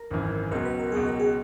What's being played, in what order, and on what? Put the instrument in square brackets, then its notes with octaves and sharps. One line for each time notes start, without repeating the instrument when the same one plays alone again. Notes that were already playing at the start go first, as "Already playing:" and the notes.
Already playing: [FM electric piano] A#4
[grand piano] G#1 F#2 E3
[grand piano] C#2 B2 F#3 [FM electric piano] A#4
[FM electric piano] B4
A#4
[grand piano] C#2 B2 F#3 [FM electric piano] G#4
[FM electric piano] A#4
G#4